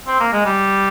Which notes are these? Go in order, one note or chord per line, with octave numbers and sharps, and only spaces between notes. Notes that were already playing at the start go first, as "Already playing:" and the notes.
C4
A#3
G#3
G3